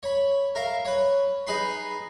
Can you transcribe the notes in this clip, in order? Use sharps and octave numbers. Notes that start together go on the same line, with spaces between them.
C#5 B5
A#4 E5 F5
B4 C#5
D#4 G#4 B4 B5 C6